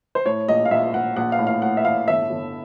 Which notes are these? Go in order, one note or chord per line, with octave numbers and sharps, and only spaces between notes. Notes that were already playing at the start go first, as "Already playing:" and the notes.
C5
A2 C#5
A#1 D#5
F5
A#1 E5
A#1 F#5
A#1 F#5
F5
A2
F5
A2 F#5
E5
A2 F5
G1 E5
G1